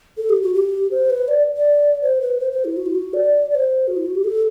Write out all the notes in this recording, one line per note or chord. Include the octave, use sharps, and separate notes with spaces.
A4
G4
F#4
G4
C5
B4
D5
D5
C5
B4
C5
C5
E4
F#4
E4
F#4
D5
D5
C5
F#4
E4
F#4
G4
A4